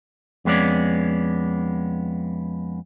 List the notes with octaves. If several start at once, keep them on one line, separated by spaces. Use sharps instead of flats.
F2 G#3 B3 C#4 D5